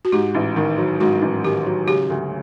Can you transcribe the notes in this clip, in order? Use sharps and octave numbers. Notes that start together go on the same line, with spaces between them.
F#4
G#2 G4
A1
D#3
F#3
G#2 F#4
A1
D#3 G4
F#3
C#3 G4
D2